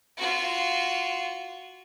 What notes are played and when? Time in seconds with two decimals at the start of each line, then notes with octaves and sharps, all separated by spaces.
0.17 F4 F#4